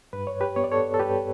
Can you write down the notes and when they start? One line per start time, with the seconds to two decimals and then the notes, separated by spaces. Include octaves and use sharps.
0.13 G2 B4
0.27 C#5
0.41 G4 B4
0.56 B3 C#5
0.64 D5
0.72 A4 C#5
0.94 A4
0.99 G2 G4 B4